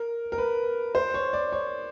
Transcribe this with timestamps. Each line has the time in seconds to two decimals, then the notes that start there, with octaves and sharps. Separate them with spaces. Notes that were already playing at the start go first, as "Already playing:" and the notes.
Already playing: A#4
0.32 A#4
0.38 B4
0.95 C5
1.14 C#5
1.33 D5
1.52 C#5